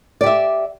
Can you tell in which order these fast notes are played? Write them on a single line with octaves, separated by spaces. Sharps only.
D5 G4 E5